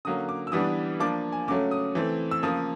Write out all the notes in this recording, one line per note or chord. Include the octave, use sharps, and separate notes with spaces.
D3 F#3 A#3 C#4 D#6
D6
E6
E3 G3 B3 D4 D#6
F3 A#3 D4 D6
G#5
C#3 F#3 A3 C#4 D6
D#6
E3 A3 C4
E6
C#3 F3 A#3 D#6